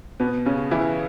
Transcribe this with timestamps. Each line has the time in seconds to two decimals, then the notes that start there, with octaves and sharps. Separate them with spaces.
0.20 B2 B3
0.46 C#3 C#4
0.71 E3 E4